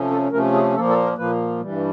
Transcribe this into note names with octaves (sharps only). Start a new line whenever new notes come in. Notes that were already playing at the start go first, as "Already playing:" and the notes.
Already playing: C3 F3 A3 C#4
A4
C3 F3 A3 C#4 A#4
G#4
A#2 F3 A#3 A4
A4
A#4
A#2 F3 A#3 B4
G2 E3 G3